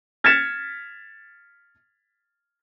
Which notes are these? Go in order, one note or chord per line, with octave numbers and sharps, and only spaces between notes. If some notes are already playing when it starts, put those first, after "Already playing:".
F6 G#6 A6 B6 C#7 E7